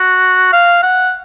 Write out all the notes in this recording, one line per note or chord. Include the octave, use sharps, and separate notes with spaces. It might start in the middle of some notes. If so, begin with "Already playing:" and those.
Already playing: F#4
F5
F#5